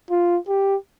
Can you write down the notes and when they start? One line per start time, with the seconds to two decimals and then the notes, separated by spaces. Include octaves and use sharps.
0.10 F4
0.48 G4